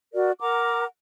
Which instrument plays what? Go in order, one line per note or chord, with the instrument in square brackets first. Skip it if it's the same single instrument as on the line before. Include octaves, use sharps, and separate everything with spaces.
[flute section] F#4 A#4 D5
A#4 F#5 A#5 D6